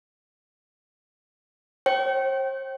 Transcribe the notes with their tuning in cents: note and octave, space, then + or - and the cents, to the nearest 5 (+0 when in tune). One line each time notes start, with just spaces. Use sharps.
C5 +40 G5 -25